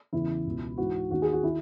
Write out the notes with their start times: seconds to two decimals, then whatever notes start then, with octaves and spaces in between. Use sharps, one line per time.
0.13 E2 C#3 E3 E4
0.46 C#2 B2
0.78 G#2 E3 F#4
1.10 D#2 D#3 F#4
1.22 G#4
1.33 F#4
1.43 D#3 E4